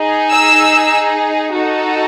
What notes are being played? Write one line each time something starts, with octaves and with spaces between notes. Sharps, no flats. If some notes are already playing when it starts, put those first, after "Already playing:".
Already playing: D#4 G#4
E6
D#4 F#4 A4